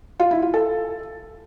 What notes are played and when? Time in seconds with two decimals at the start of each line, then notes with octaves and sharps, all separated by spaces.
0.20 F4
0.31 E4
0.42 F4
0.54 A4